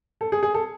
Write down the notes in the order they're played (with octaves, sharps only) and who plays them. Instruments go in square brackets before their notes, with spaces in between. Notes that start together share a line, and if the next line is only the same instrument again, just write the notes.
[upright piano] A4
G#4
G#4
A4